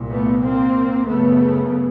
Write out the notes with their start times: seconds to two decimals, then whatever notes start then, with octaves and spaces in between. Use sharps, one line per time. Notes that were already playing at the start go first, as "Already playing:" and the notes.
Already playing: C2 A#2
0.11 A3 B3
0.43 A#3 C4
1.07 F#2 C#3 A3 B3